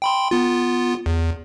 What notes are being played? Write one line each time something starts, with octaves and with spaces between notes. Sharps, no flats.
G5 B5 C6
B3 F4
E2